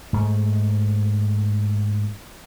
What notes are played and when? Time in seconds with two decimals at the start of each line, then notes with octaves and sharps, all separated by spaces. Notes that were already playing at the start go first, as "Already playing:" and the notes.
0.13 G#2 A3